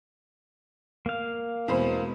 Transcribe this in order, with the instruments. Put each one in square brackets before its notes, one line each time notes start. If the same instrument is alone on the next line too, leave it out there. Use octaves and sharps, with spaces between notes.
[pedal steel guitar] A#3 F5
[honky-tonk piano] E2 C5 B5 [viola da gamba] B2 G#3 C4